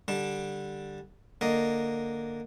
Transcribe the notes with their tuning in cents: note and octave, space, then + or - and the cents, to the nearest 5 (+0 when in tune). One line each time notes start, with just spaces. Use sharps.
D3 +0 G3 +0 A5 +5
D3 +0 A#3 -10 D#5 +0